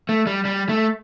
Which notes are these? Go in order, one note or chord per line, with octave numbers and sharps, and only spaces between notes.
A3
G3
G3
A3